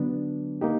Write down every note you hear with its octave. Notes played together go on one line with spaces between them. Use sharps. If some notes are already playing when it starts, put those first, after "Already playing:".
Already playing: D3 F#3 B3 D4
A#3 D#4 G4